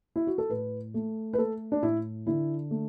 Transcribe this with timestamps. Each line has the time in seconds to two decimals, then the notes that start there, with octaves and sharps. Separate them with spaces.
0.16 E4
0.27 F#4
0.38 A4
0.50 A2 B4
0.94 A3
1.33 B4
1.38 A3 A4
1.72 D4
1.82 A2 E4
2.27 D3 E4
2.71 A3